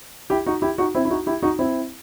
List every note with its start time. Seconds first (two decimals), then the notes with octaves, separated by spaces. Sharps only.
0.30 E4 G4
0.46 D#4 F#4
0.62 E4 G4
0.78 D#4 F#4
0.95 C4 E4
1.05 E4
1.10 D#4 F#4
1.26 E4 G4
1.42 D#4 F#4
1.59 C4 E4